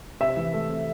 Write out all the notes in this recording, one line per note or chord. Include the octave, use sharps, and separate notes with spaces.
C3 E5
E3
A3
C3